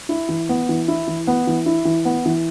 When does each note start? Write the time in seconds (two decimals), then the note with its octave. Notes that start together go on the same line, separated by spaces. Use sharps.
0.09 E4
0.29 E3
0.49 B3
0.69 E3
0.88 E4
1.08 E3
1.27 B3
1.47 E3
1.66 E4
1.85 E3
2.05 B3
2.26 E3